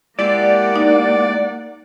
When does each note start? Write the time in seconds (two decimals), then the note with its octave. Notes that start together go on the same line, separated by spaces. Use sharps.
0.19 G#3 A#3 E4 G4 D5 F#5
0.76 D#4